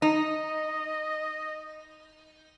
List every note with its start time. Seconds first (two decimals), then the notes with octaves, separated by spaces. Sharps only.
0.02 D#4 D#5